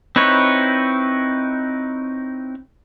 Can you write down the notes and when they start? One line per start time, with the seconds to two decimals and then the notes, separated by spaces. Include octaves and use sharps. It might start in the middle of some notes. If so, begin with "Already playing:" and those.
0.16 C4 D#4 E4 B4 C#5